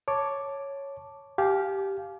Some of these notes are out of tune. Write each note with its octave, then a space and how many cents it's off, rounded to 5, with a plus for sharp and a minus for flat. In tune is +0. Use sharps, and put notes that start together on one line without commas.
C#5 +0 A5 +0 D6 +0
G4 -5 F5 +0 G#5 +40